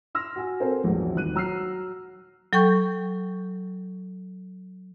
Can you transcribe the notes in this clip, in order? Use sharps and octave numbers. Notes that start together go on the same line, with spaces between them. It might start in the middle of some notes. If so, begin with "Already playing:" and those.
C6 E6 F6 A#6
F#4 G#5
C4 A4 A#4 C5 G#5
A#1 E2 G#2 F#3
D#1 D#3 F#6 D#7
F#3 A#5 E6 F6 C7
F#3 A4 G5 C#6 G6